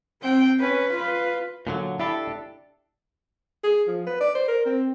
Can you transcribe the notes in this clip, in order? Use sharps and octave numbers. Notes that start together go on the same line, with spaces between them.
C4 G5
C#4 B4
F4 B4
A#2 D3 F#3
D4 E4 G4 A4
G#4
F3
B4
D5
C5
A#4
C4